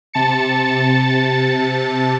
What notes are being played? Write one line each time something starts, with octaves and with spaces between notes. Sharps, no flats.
C3 A5 A6 C#7